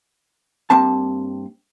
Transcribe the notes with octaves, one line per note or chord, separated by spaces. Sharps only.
G2 A#3 C4 A5